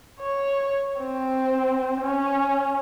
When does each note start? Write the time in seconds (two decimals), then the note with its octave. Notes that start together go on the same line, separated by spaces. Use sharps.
0.20 C#5
1.00 C4
2.01 C#4